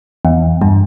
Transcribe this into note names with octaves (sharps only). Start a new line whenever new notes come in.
E2
G2